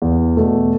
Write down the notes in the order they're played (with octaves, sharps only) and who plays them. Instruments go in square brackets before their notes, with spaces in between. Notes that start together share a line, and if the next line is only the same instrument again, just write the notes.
[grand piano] E2
B2 A3